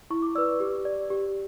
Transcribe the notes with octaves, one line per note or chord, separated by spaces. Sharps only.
E4 C#6
D6
B4 D5 E6
G4
D5
G4